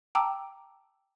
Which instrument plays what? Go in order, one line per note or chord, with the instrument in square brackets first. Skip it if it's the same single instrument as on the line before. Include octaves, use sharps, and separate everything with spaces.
[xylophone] G5 A5 A#5 D6 E6